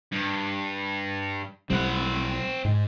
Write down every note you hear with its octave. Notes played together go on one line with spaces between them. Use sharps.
G2
B1 G3 C4 F#5
G#2